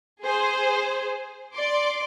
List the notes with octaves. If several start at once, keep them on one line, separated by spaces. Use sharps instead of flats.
G#4 C5
D5 C6 D6